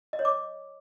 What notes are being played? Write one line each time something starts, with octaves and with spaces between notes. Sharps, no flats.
D#5
C#5
D6